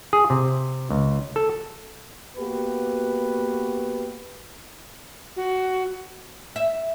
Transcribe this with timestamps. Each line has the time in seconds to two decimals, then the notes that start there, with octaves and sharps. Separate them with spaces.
0.13 G#4
0.30 C3
0.90 C#2
1.36 A4
2.37 A#3 B3 F#4 G4 B4
5.36 F#4
6.56 E5